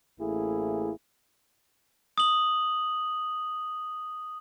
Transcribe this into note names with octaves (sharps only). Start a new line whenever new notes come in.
A1 A3 A#3 E4 G#4
D#6 F#7